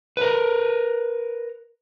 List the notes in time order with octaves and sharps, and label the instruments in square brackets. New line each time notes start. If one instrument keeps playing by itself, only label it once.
[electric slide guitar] A#4 B4